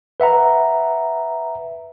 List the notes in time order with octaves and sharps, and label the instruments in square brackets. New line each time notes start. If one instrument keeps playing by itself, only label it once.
[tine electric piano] B4 E5 F#5 A#5